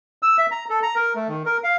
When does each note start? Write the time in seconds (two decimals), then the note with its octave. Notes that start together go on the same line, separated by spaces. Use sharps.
0.23 E6
0.38 E5
0.51 A#5
0.70 A4
0.83 A#5
0.96 A#4
1.15 A3
1.28 D#3
1.46 A#4
1.64 F5